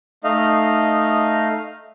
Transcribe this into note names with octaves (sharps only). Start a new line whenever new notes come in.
A3 D#4 D#5 F5